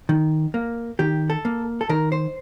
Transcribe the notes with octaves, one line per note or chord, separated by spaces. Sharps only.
D#3
A#3
D#3 G4
A4
A#3
A4
D#3 A#4
C5